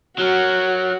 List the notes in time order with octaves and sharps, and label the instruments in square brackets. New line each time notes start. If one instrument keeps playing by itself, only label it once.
[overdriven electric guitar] F#3 A#4 [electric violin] F#4